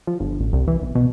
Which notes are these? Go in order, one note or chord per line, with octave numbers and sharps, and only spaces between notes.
F3
G1
A1
C2
E3
B1
B2